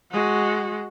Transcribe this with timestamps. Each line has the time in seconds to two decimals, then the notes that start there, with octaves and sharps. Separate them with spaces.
0.12 G#3 F#4